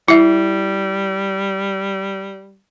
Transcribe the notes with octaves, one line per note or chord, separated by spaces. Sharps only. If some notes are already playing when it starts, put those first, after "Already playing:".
G3 E4 E5